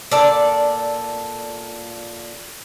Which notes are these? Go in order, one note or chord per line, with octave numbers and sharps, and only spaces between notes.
A#2 A4 D5